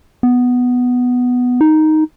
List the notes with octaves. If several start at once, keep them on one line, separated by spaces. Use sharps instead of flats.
B3
D#4